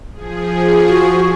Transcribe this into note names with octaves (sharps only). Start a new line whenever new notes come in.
F3 G#4
F#4